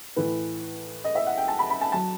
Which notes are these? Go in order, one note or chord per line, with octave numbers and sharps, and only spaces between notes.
A2 E3 B4
D#5
E5
F#5
G5
A5
B5
B5
A5
F#3 A5